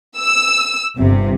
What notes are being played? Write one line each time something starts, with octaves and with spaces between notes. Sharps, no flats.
E6
G1 C3